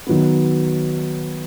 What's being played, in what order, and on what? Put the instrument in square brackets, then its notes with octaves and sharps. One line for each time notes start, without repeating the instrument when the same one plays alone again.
[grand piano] D#3 F#3 B3